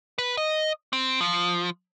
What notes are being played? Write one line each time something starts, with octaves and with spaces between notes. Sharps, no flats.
B4
D#5
C4
F3